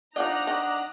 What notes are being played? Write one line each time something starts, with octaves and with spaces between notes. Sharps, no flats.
F3 D4 D#4 F4 D#5 F#5 A#5
D#3 D#5